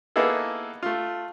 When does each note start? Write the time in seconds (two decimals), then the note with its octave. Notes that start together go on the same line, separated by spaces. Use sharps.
0.16 A#3 B3 D#4 E4 G#4 A4
0.83 A3 F4